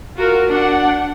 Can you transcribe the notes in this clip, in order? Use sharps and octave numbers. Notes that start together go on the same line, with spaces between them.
F4 F#4 A#4
D4 F#5